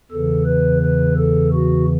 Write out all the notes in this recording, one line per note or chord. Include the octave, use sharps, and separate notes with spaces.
E2 C#3 E3 A4
B4
B4
A4
F#4